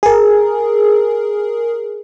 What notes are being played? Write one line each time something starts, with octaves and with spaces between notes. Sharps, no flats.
G#4 A#4